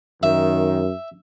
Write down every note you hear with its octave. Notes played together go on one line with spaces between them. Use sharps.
F#2 D#3 E5